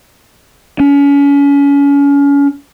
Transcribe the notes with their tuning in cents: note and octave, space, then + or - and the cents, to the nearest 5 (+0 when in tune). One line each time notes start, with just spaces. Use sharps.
C#4 +35